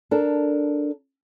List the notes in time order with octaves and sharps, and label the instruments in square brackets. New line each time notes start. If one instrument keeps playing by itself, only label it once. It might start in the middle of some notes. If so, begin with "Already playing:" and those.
[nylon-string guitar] D4 A4 A#4